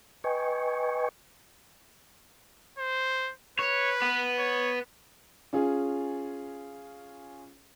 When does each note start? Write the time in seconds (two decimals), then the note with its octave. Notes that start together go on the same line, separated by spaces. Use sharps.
0.24 B4 D#5 G5 G#5 C#6
2.79 C5
3.59 B4 C#5
4.02 B3
4.39 C#5
5.53 C#4 F4 G#4